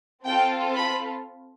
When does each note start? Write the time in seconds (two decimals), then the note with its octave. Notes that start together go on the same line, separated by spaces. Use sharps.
0.24 C4 F4 A4 G5
0.75 B5